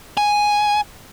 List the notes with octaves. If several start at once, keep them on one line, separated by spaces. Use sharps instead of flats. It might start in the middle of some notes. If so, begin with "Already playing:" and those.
G#5